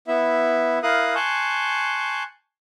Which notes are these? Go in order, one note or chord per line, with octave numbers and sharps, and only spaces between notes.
B3 E4 E5
E4 A#4 F5 D#6 F#6
G#5 A5 C6 C#6 F#6 G6